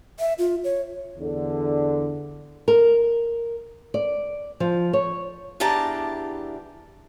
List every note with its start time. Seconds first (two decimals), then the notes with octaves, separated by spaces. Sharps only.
0.19 E5
0.38 F4
0.64 C#5
1.18 E2 D3
2.68 A#4
3.94 D5
4.60 F3
4.93 C#5
5.60 E2 E3 D4 G4 A5 A#5